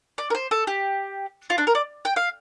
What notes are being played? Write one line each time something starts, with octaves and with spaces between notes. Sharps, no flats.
D5
A#4
C5
A4
G4
F4
D4
A#4
D5
G5
F5